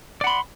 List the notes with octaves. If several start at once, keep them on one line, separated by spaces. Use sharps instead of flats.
D5 F#5 B5 C6